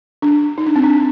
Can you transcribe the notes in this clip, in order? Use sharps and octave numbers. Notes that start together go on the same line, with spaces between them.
D4
D#4
D4
C4
D4